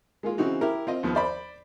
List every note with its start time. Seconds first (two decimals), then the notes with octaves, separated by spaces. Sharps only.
0.23 G#3 A#3 F4
0.38 C#3 E3 C4 D#4 F#4
0.61 E4 G4 A#4
0.87 C4 F4 D#5
1.03 D#2 F3 B3
1.15 C5 D5 B5